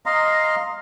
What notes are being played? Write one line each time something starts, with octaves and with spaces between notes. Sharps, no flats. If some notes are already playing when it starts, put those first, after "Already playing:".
D#5 F5 A#5 C6